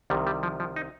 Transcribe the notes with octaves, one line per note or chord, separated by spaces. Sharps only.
C2 C3 D#3 G3
G3
F3
F3
D#4